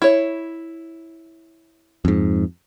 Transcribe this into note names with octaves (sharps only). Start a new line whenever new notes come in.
E4 C#5
F2 G#2